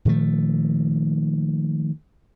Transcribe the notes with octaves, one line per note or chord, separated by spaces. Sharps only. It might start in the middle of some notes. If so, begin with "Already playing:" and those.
A#2 D#3 F3 A3